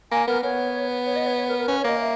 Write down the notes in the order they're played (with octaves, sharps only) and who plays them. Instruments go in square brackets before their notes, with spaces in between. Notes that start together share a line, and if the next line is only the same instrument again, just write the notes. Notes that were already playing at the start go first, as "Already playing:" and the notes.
[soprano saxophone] A#3 [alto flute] G#5
[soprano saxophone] B3 [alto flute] A#4
[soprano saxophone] B3 [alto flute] C#5
[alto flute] C#5
D#5
C#5
C#5
A#4
A#4
[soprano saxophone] C#4 [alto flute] B4
[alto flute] C#5
[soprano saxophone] A#3 [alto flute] D#5
[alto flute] E5